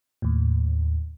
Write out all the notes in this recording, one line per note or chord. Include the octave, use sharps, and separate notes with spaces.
D#2 A2